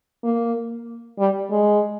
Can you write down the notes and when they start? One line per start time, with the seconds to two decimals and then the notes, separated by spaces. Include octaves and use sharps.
0.24 A#3
1.19 G3
1.51 G#3